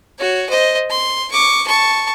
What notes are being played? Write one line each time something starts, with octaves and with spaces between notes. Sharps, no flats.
F#4 C#5
C5 D#5
C6
C#6 D6
A5 C#6